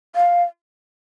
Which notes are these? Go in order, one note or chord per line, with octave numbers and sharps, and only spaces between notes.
F5